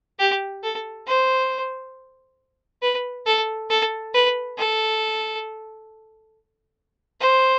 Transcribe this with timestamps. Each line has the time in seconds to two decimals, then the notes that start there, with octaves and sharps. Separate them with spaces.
0.19 G4
0.63 A4
1.07 C5
2.82 B4
3.26 A4
3.70 A4
4.14 B4
4.58 A4
7.20 C5